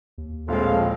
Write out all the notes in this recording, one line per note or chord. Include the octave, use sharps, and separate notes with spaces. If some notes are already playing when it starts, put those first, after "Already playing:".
D#2
A#1 A2 F3 G#3 C4 A4 F5